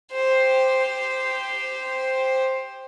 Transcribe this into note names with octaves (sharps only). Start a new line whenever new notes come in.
G4 C5